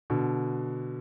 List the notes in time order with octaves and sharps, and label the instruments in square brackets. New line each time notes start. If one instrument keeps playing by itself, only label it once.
[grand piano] B2 D3